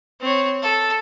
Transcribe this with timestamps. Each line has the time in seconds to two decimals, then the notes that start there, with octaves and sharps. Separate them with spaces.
0.21 C4 C#5
0.62 A4